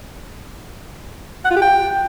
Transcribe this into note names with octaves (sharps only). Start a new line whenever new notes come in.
F#5
F4
G4
G5